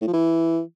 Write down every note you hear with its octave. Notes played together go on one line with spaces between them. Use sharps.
A2
F3
E3